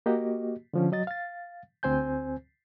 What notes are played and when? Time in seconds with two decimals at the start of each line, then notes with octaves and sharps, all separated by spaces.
0.06 A#3 F#4 G4 D#5
0.73 D3 F3 C#4
0.92 F#3 D#5 A6
1.07 F5 A6
1.83 D2 C4 C5 G#5 G6